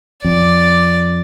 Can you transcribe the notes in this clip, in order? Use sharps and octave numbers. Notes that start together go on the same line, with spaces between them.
F2 D5